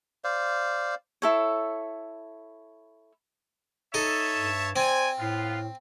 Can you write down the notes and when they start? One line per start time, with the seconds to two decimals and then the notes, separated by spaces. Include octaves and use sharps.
0.24 C5 D5 F5
1.22 E4 A4 C#5
3.94 D#4 A4 C#5 E5 A5
4.34 G2
4.76 C4 C5 D5 G#5
5.19 A2 B3 F4